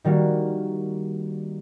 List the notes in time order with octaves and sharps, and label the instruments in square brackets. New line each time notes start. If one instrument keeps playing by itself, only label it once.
[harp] D#3 G3 A#3 F#4